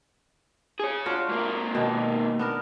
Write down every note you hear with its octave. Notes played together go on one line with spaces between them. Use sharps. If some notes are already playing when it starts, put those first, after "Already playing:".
G#4 C#5
D4 F4 F#4
G#2 A#3
B2 D#3
B3 D4 A#4